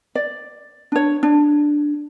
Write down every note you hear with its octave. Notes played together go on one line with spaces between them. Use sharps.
D5
D4 C#5
D4